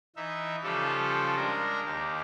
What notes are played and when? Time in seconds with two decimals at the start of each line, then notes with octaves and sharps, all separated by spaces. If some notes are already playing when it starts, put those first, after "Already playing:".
0.16 E3 D#4 E5
0.63 C#3 F3 G3 F4 G4 A4
1.36 G#3 D4 A#4 A#5
1.85 D#2 G4